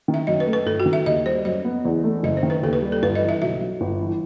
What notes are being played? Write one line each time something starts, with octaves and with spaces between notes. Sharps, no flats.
D#3
E5
F#2 D#5
B4
A3
B4
G1 A4
F#4
D#3
E5
D#2 D#5
G3 C5
F#2 D#5
B3
E2
A3
F#1 D#5
C5
D#3
B4
D#2 A4
B4
G3
A4
G1 B4
D#5
E3
E5
B1 E5
F#3
G1
E3